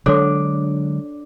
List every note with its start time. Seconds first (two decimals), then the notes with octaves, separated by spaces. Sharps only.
0.06 D3 F#3 G#3 D4 A4 C#5 D#6